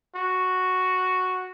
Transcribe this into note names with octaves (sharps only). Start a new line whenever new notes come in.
F#4